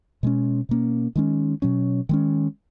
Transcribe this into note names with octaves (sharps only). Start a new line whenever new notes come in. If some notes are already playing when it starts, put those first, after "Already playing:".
B2 G#3 C#4
B2 A#3 C#4
D#3 G#3 C#4
B2 F#3 C#4
D#3 G#3 C#4